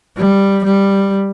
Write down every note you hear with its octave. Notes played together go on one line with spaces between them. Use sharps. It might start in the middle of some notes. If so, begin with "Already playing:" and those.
G3
G3